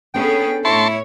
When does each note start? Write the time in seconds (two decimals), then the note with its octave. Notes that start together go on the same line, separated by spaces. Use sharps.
0.14 B3 C#4 D4 G#4 A4 G5
0.65 A2 E4 C#5 A5 C6 C#6